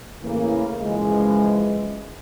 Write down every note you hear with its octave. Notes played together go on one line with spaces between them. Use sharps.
A2 C#3 E3 A#3
F#2 C#3 E3 F3 G#3